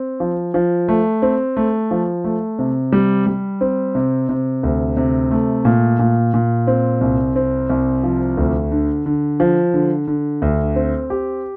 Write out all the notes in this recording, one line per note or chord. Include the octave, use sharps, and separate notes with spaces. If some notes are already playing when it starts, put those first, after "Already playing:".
Already playing: C4
F3
F3
A3
C4
A3
F3
A3
C3
G3
G3
C4
C3
C3
D2
C3
A3
A#2
A#2
A#2
C4
C2
C4
C2
F3
D2
D3
D3
F3
D3
D3
D2
C4
G4